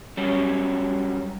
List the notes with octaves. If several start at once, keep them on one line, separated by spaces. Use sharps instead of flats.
F#3 G3 C#4